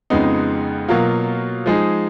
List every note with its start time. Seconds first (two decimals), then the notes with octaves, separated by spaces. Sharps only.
0.10 F2 C#3 G#3 B3 D#4
0.88 B2 F#3 A#3 F4
1.66 F3 G#3 D#4 G#4